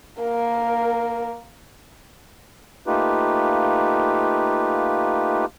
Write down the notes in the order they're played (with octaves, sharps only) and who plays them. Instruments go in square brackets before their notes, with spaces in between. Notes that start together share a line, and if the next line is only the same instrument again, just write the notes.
[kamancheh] A#3 A#4
[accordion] A3 A#3 D#4 F4 G4 B4